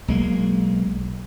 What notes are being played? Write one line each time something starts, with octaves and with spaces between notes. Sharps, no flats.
B1 G#3 A#3